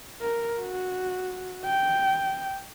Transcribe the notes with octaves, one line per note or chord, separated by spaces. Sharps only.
A#4
F#4
G5